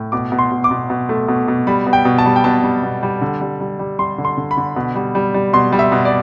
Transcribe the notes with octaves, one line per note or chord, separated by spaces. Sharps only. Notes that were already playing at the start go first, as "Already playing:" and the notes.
Already playing: A2
B2 D6
B2
C6
B2
D6
B2
B2
A3
B2
B2
G3 B5
B2
G5
B2
A5
G3
G5
B2 A5
G3
B2
G3
D3
G3
G3
G3
G3 C6
D3
C6
D3
B5
D3
B2
G3
G3
G3
B2 C6
G3
E5
B2
D5